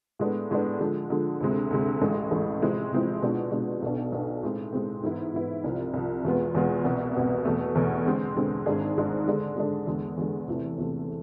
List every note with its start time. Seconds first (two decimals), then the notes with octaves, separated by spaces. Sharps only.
0.19 A2 G#3 B3 D4
0.51 A2 G#3 B3 D4
0.80 D3 F3 G#3
1.10 D3 F3 G#3
1.40 D2 C3 G#3
1.71 D2 C3 G#3
2.01 A1 A2 G#3
2.31 A1 A2 G#3
2.62 C3 F3 G#3 C4 E4
2.92 C3 F3 G#3 C4 E4
3.22 B2 G#3 D4 F4
3.52 B2 G#3 D4 F4
3.82 B1 B2 B3 D4
4.12 B1 B2 B3 D4
4.43 A2 G#3 C4
4.73 A2 G#3 C4
5.03 G#2 E3 B3 E4
5.34 G#2 E3 B3 E4
5.64 C2 C3 F3
5.94 C2 C3 F3
6.24 E2 B2 G#3 B3 F4
6.55 E2 B2 G#3 B3 F4
6.84 C2 B2 B3
7.14 C2 B2 B3
7.45 E2 B2 A3
7.75 E2 B2 A3
8.06 D3 G#3 C4
8.36 D3 G#3 C4
8.66 G#1 G#2 G#3 D4 G#4
8.97 G#1 G#2 G#3 D4 G#4
9.27 D3 G#3 D4
9.56 D3 G#3 D4
9.87 E2 D3 G#3
10.17 E2 D3 G#3
10.48 E2 C3 E3 A3
10.78 E2 C3 E3 A3